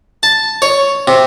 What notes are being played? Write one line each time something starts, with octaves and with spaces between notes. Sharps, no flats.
A5
C#5
C3